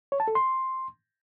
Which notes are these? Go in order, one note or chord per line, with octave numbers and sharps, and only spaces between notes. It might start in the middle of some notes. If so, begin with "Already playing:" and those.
C#5
A5
A4
C6